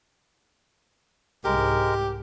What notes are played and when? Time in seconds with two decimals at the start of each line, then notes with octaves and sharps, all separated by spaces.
1.45 C2 G#2 G#3 G4 A#4